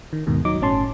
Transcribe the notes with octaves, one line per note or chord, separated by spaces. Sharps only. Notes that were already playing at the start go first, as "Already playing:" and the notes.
D#3
D#2 G#2 B2 D#3
F#3 D#4 D6
G1 A2 C#4 A5 C6